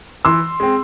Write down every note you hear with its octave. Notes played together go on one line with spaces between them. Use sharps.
E3 C6 E6
G#3 C4